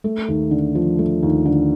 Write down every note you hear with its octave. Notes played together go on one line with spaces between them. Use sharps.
A3
D#2
D3
F3
A3
D#2
D3